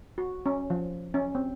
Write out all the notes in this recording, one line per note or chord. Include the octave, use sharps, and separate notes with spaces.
F#4
C#4
F3
C#4
C4